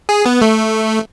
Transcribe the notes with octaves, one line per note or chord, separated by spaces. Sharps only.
G#4
B3
A3